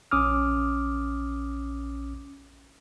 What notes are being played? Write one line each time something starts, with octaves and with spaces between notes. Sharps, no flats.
A#1 C#4 D6 D#6 F6